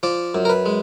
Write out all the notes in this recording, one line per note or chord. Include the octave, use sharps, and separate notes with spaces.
F3 D5
F#2
A#4
B4
G#3